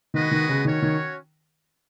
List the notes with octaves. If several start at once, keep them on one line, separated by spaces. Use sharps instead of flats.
D#3 G#3 B3 F#4 B4 D#5
D#3
C#3
D#3 C#4 F#4 C#5
D#3